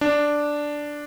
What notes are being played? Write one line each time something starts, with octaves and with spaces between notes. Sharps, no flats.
D4